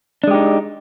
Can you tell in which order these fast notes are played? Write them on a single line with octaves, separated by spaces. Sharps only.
D4 G#3 G4 D#4